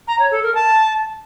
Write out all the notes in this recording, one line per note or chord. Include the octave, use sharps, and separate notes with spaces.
A#5
C#5
A4
A#4
A5